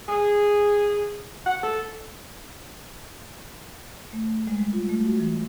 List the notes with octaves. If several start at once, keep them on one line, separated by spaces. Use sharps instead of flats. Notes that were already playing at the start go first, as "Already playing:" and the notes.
G#4
F#5
A4
A3
G#3
G3
F4
A3
F#4
E3